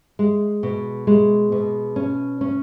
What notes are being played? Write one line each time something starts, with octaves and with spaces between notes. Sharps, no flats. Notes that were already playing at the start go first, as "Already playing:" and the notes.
G#3
B2
G#3
B2
C#4
C#4